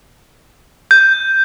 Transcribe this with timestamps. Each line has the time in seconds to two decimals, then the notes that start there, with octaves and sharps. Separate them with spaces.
0.91 G6